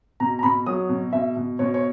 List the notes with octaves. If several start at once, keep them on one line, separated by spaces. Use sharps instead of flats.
B2 A#5
A#5
B2 B5
F#3 D#6
B2
B2 E5
B2
B2 C#5
C#5